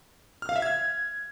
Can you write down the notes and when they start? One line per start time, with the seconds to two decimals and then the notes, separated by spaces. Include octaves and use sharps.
0.42 F6
0.49 F5
0.56 E5
0.62 G#6